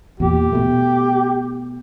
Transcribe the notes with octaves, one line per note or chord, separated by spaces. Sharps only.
E2 A#2 G4
B2 A3